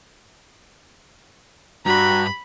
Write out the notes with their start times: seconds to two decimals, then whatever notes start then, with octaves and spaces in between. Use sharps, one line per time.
1.86 G2 F#4 A#5 B5